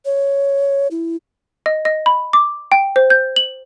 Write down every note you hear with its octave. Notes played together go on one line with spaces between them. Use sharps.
C#5
E4
D#5
D#5
B5
D6
G5
C5
G6
F#7